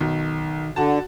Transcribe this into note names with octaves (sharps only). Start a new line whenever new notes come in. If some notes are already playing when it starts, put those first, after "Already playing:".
B1 D#3
D3 F#4 A5